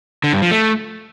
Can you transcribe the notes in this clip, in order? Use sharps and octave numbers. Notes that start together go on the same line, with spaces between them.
D3
G2
F3
A3